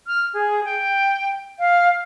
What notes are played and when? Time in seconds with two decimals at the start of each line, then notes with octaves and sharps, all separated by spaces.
0.07 F6
0.34 G#4
0.64 G5
1.59 F5